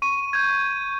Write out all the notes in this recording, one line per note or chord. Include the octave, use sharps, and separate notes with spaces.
C#6 D#7
G6 G#6